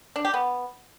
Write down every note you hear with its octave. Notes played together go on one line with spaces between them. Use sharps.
D4
G4
B3